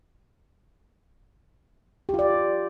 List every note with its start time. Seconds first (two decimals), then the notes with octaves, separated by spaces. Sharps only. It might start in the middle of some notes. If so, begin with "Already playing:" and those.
2.09 G4
2.14 F4
2.19 D5